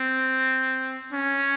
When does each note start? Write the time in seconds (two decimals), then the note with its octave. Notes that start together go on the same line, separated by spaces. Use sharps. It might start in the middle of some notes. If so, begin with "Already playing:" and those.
Already playing: C4
1.12 C#4